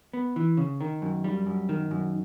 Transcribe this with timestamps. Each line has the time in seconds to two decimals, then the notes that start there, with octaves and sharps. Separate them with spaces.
0.13 B3
0.36 E3
0.57 C#3
0.81 D#3
1.02 F#2
1.24 G3
1.46 F#2
1.69 D#3
1.91 F#2